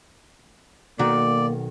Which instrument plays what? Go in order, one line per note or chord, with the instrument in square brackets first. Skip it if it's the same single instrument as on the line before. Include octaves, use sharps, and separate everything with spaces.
[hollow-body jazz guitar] B1 D#3 F#4 [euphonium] A#3 [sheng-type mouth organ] D5